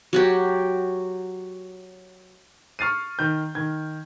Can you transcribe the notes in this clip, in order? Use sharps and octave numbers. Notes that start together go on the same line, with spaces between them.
F#3 F#4 G4
C#6 F6 A6 C7 D#7
D#3 G6
D#3 G#6